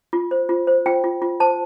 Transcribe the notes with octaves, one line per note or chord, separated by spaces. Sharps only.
F4
C5
F4
C5
F4 G5
F4
F4
C5 A5